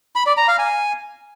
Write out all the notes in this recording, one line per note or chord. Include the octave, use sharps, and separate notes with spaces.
B5
D5
A#5
F5
G#5